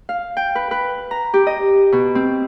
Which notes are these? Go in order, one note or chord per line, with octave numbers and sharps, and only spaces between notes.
F5
G5
B4
B4
A#5
G4
D#5
B2
C4